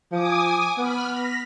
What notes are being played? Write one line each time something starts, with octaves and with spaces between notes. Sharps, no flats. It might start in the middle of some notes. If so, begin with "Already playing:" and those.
F3 G#5 D6 D#6
B3 B5 F6
A#6 B6